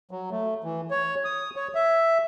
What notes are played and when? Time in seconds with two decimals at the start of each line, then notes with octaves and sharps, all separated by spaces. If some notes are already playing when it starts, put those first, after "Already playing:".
0.11 F#3
0.31 A3
0.64 E3
0.90 C#5
1.25 D#6
1.56 C#5
1.75 E5